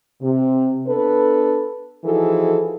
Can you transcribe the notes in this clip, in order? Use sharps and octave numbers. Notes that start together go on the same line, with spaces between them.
C3
B3 D4 A4 B4
E3 F3 D#4 F#4 G#4 A4